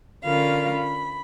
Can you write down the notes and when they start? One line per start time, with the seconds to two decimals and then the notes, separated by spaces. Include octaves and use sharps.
0.25 D3 C#4 F4 A#4 F5 B5
0.71 B5